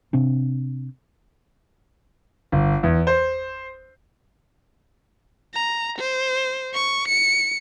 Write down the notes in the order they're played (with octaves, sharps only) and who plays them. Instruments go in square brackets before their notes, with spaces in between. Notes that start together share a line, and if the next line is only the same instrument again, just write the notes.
[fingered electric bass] C3 C4 D4
[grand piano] G1
E2
C5
[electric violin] A#5
C5
C#6
C#7